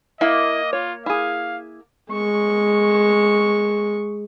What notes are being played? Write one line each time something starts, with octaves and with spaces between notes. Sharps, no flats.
A#3 E4 D#5
F4 C#5
E4 G#4 F5
G#3 C#6